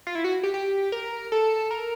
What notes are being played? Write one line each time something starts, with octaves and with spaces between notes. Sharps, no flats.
F4
E4
F#4
G4
G4
A#4
A4
A#4